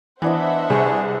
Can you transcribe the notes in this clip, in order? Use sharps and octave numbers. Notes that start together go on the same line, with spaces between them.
E3 B3 D4 C5 D#5 E5 F#5
C2 G#4 D5 A5 C#6